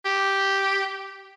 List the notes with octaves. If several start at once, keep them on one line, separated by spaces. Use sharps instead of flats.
G4